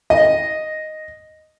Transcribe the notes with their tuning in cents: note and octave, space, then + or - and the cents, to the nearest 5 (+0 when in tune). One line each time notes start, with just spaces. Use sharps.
D#5 +0